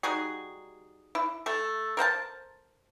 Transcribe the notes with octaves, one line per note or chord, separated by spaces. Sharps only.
G3 D#4 F#4 G#4
E4
A3 A4
A#4 C5 F#5 A5